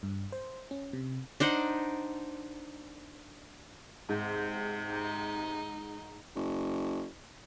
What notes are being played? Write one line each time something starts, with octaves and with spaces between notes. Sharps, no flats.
G2
C5
C#4
C3
D4 D#4 C5 F#5
G#2 C3
D#4
F#1